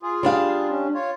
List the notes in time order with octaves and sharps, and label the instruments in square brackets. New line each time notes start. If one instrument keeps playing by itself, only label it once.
[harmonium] F4 G#4
[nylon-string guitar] G3 D4 F5
[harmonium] C#4
F4 C#5